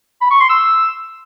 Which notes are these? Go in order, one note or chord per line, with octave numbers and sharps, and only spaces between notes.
B5
C#6
C6
E6